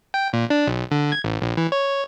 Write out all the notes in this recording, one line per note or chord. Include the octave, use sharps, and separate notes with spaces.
G5
A#2
D4
B1
D3
G#6
A1
A#1
E3
C#5